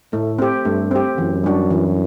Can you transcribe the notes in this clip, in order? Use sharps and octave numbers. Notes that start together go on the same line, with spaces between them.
A2 A3
C4 G4
G2 A3
C4 G4
F#2 E3
G3 D4 F#4
E3